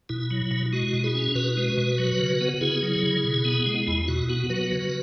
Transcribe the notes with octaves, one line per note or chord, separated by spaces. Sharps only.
B2 E4
F#3
B2
G#3 F#4
B2
E4 G#4
C#4
B2 F#4 B4
G#3
B2
F#3
C#3
B3
C#3 E4 G#4
F#3
C#3
B2
B3
G#3
E2 E4
B2 F#4
B3 F#4
F#3 F#4 B4
C#3